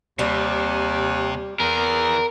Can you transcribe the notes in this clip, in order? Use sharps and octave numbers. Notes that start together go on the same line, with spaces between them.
D#2 C3 G3
E2 E3 G#4 A#4